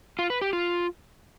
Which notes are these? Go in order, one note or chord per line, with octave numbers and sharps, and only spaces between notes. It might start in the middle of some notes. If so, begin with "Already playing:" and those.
F4
B4
G4
F4